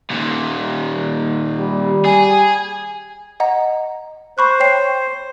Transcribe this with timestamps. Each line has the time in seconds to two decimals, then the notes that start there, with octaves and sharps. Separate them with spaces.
0.10 D#2 A#2
1.60 G3
2.05 G#4 G#5
3.40 D#5 F#5 A#5
4.38 C5 B5 C#6 F#6
4.60 C#5 G5 C7